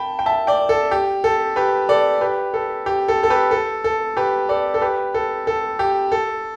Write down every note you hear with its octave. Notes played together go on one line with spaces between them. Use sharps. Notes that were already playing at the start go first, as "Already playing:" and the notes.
Already playing: G5 A5 B5
G5
E5 A5
D5 G5
A4
G4
A4
G4 B4
A4 D5
G4 B4
A4
G4
A4
A4
G4 B4
A4
A4
G4 B4
A4 D5
A4
G4 B4
A4
A4
G4
A4